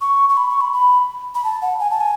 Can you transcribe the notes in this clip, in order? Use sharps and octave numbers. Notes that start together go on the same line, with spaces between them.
C#6
C#6
B5
C#6
B5
B5
B5
A5
F#5
G#5
A5
G#5